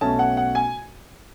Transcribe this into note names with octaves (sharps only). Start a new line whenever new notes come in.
B1 B2 A3 C#4 A5
F#5
F#5
G#5